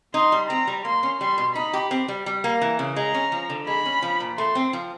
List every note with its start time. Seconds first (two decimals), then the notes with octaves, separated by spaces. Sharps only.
0.14 D#4 C6
0.32 G3
0.50 C4 A#5
0.67 G3
0.85 A#3 C6
1.03 C#4
1.20 G3 C6
1.38 B2
1.55 D#4 B5
1.74 G4
1.91 C4
2.08 G3
2.26 G3
2.44 A#3
2.62 E3
2.79 C#3
2.96 G#3 A#5
3.14 C#4
3.32 F3
3.50 D3
3.67 G#3 B5
3.85 C#4
4.02 F3
4.20 A#2
4.38 A3 C6
4.55 C4
4.73 F3